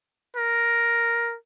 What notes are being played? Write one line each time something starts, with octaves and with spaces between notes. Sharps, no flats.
A#4